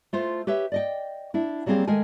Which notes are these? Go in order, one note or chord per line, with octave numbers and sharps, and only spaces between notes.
A3 F4 C5
G4 B4 C#5 E5
D5 D#5 G5
D4 E4
F#3 G3 A#3 C4 G#4 F5
D#3 G#3 A3 A#4 G#5